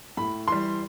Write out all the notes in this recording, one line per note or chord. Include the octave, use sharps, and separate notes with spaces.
A2 B5
E3 G3 C6